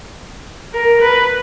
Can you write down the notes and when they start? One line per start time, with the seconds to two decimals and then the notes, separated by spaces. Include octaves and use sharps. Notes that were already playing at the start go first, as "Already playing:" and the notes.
0.73 A#4
1.02 B4